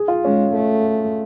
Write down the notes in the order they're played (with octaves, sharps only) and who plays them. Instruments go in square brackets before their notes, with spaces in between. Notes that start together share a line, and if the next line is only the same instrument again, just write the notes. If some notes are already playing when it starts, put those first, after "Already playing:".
Already playing: [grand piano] G#4
F4
[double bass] G#3 [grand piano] C#4
[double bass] A3